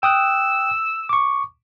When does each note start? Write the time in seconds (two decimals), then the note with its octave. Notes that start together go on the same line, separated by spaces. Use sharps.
0.03 G5 D#6 E6 F#6
1.09 C#6 D6